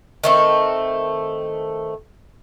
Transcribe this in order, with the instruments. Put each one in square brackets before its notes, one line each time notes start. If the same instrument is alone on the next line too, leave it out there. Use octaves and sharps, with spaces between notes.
[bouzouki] D#3 A3 C4